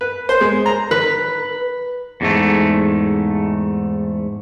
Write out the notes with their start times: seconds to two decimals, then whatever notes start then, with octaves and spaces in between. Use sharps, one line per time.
0.01 B4
0.29 C5
0.41 G#3
0.66 A#5
0.91 B4
2.21 E2 G#2 A3